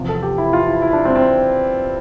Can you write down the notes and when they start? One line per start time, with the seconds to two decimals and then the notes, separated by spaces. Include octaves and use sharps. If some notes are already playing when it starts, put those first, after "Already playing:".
Already playing: E2 C3 F3
0.09 A4
0.22 G4
0.38 E4
0.53 F4
0.67 E4
0.82 E4
0.93 D4
1.05 C4
1.16 C4